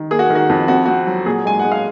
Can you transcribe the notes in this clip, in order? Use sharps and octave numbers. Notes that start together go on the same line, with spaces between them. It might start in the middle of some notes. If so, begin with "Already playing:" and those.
Already playing: D#3
A#3 G#4
F#4
D#3
F#4
F2
C4 F#4
C4 F#4
F#3
A#2 G#4
G#3 G#5
G#3 F#5
F5